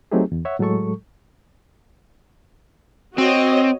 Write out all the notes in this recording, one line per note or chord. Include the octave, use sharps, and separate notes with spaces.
F#3 A3 C4 D#4 G4 G#4
E2
C#5 E5 F#5
A2 F#3 G#3 A4 C#6
C4 F#4 C#5 D#5